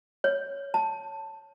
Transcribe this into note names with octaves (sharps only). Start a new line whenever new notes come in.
C#5
A5